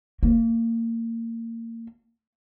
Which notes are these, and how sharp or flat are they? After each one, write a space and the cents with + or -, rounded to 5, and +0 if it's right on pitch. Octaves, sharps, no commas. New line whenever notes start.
A#3 -30